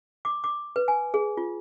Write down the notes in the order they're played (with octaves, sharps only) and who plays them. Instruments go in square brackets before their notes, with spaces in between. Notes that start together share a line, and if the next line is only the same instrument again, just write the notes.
[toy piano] D6
D6
B4
G#5
G#4
F4